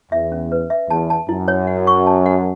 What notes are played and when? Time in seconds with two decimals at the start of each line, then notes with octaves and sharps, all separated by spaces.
0.12 E2 E5
0.32 C#4
0.52 B4
0.70 E5
0.90 E2 A5
1.10 A5
1.29 F#2 E4
1.48 C#5
1.67 F#5
1.87 C#6
2.07 A5
2.26 F#5